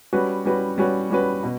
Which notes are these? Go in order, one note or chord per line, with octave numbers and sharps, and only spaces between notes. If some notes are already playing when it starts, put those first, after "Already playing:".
G3 C#4 F#4 B4
G3 C#4 F#4 B4
G3 C#4 F#4 B4
G3 C#4 F#4 B4
B2